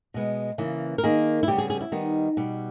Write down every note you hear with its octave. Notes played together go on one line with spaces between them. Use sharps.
B2 G#3 B3
C#3 E3 A#3
A#4
D#3 A#3 G#4
E4
C#3 G3 B3 G4
G#4
G#4
E4
D#3 G3 B3 D#4
B2 G3 B3